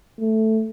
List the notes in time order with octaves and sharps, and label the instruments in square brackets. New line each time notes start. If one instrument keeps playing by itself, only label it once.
[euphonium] A3